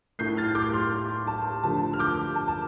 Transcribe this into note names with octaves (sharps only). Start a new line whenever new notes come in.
A2 A3 G6 C7
F6 A6
D6 G6
C6 F6
A5
D3 F3 A3 A5
F6
D6 G6
A5
A5